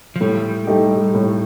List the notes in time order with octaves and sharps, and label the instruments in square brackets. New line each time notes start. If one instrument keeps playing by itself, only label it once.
[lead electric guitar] F3
[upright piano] A2 [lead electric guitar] G3
[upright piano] A3 D#4 G4
A2